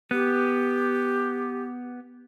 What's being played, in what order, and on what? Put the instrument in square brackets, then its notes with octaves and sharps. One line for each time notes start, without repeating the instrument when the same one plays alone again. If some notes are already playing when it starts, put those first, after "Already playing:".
[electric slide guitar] B3 [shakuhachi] G4